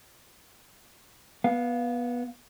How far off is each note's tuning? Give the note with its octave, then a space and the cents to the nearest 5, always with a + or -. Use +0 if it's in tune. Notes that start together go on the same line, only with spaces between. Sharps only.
B3 -15 F5 +5